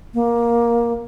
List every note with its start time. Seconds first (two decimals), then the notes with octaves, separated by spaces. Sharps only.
0.14 A#3